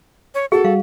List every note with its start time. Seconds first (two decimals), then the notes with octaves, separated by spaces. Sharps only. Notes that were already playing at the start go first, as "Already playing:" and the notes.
0.35 C#5
0.52 F#4 G#4 A4
0.64 G3 F5